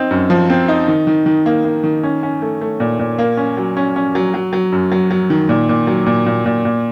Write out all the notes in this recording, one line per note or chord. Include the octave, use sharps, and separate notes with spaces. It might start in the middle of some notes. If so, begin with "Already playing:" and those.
Already playing: C4 D#4
F#2
F3
C4
D#4
D#3
D#3
D#3
A#3
A#3
D#3
C#4
C#4
A3
A3
A#2
A#2
A#3
C#4
F#3
C#4
C#4
F#3
F#3
F#3
F#2
F#3
F#3
D#3
A#2
A#2
F#3
A#2
A#2
A#2
A#2